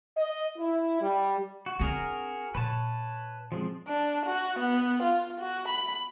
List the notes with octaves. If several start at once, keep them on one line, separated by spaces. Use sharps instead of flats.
D#5
E4
G3
F#4
C4 D4 F#4 G#4 A#4
A#2 B4 C#5 A5
F3 G#3 C4
D4
F#4
B3
F4
F#4
B5